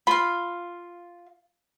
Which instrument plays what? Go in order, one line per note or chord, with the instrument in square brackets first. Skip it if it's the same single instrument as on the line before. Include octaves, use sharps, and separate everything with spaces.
[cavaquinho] F4 F5 [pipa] B5